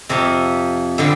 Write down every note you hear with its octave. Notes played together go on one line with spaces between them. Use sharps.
F2 C3 F3
D3 G3 C4